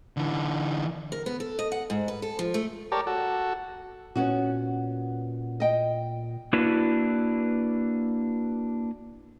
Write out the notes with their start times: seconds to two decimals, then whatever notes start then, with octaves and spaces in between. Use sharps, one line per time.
0.17 D3 E3
1.12 A#4
1.26 B3
1.40 A4
1.59 D#5
1.72 F#5
1.90 G#2
2.08 B4
2.22 A4
2.39 F3
2.54 A3
2.92 G4 A#4 C#5 D5 A5
3.07 F#4 A4
4.16 A#2 B3 C#4 F#4
5.60 D#5 G5
6.53 A#3 D4 E4 F#4 B4